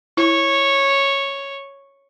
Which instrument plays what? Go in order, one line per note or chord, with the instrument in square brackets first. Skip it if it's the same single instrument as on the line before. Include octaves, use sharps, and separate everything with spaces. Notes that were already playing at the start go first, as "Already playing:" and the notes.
[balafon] E4 [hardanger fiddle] C#5